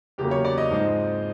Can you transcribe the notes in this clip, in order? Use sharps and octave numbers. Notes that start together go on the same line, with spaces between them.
E2 C#3 F#3 A#3 G4
C#5
D5
D#5
G#2 F3 G#3 C4